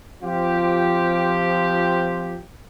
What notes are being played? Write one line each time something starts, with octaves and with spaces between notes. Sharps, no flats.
F3 C4 F4 G4